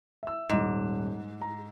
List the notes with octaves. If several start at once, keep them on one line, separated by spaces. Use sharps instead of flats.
E5 E6
D#1 G#2 D6 E7
A#5